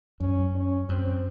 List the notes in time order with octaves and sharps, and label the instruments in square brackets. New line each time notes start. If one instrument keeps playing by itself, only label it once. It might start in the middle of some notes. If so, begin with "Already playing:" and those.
[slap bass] F#2 [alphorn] C#4
[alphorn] C#4
[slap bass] F#2 [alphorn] C4